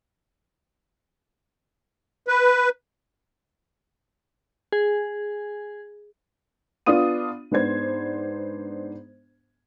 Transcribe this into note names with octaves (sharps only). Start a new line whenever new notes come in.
B4
G#4
B3 D4 F4 D#6 D#7
G#2 B3 D4 C5 G#6